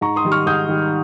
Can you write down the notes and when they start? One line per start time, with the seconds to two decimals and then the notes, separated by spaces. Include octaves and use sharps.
0.01 G#2 A#5 C#6
0.16 C6 D#6
0.25 D#3 G3
0.32 C#6 F6
0.46 G#2 D#6 G6
0.68 D#3 G3